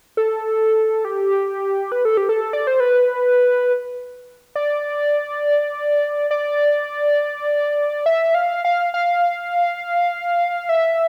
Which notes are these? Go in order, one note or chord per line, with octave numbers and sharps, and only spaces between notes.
A4
G4
B4
A4
G4
A4
D5
C5
B4
D5
D5
E5
F5
F5
F5
E5